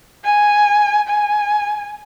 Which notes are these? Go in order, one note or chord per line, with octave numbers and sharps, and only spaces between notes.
G#5
G#5